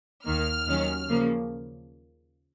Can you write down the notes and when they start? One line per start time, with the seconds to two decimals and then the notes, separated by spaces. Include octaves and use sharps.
0.25 D#2 D#3 A#3 F6
0.67 D#2 D#3 F#3 C#4
1.08 C#3 F3 A#3